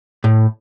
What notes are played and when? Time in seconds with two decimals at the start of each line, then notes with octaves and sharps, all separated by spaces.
0.24 A2